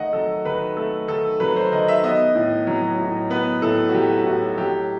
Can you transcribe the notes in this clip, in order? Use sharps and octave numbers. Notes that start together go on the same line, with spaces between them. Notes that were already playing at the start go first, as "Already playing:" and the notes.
Already playing: D#3 A3 D#5 F#5
F#3 A4
D#3 B4
A3 A4
D#3 A4
F#3 B4
C5
D#3 D#5
E5
B3 D#5
A2
F#3
A2
B3 B4
A2 A4
F#4
F#3 G4
A2 F#4
F#3 G4